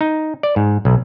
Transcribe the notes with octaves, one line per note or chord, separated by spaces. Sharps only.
D#4
D5
G#2
B1